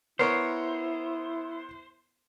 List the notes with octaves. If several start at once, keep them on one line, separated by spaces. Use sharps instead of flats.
B3 E4 A#4 C5 C#5